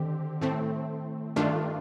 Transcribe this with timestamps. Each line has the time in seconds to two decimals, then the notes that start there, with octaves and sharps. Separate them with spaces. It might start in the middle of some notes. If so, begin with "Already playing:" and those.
Already playing: D3 D#3 C4 G4
0.41 A2 A3 C4
1.36 G2 D#3 A3 D4 F4